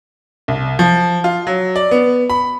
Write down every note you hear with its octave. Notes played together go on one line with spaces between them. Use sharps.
C2
F3
F4
F#3
D5
B3
B5